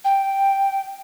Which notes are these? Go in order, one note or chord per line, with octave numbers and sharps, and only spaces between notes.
G5